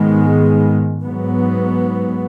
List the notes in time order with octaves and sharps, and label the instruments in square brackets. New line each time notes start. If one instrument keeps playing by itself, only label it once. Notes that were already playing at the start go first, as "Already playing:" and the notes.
Already playing: [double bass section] G#2 D#3 G#3 B3
G#2 F#3 B3